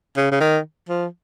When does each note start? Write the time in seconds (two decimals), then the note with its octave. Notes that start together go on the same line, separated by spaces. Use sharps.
0.17 C#3
0.31 C#3
0.41 D#3
0.89 F3